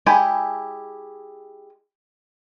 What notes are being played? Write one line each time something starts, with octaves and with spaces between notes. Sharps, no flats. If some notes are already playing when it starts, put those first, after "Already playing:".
G#3 E4 G4 G#5 B5